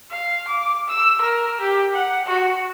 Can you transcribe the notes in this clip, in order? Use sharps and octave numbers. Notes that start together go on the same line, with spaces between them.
F5
D6
E6
A#4
G4
F#5
F#4